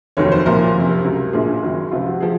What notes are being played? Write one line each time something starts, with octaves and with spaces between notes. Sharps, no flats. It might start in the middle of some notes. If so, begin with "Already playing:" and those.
F1 D#2 D#3 F#3 C#5
C5
C2 A#2 F3 A#4
F#1 F2 C3
C#2 C3 F#3
A#1 A#2 F3 G#4
F#1 F#2 D#3 F#3
C#2 C3 F3 F4
F#4
F3 G#4